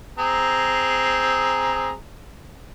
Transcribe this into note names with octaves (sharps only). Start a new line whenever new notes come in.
C4 G#4 A#5